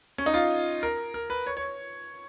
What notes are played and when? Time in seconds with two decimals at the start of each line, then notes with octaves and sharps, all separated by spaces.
0.18 C#4
0.26 D#4
0.34 F4
0.83 A#4
1.14 A#4
1.30 B4
1.47 C#5
1.57 C#5